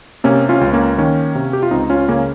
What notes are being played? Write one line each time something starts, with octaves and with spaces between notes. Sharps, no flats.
C3 A#3 C#4
C#4 F4
C#2
A#3 C#4
D#3 A#3 C#4
C3
G4
F4
C#2 C4 D#4
C#4 F4
C#3 A#3 C#4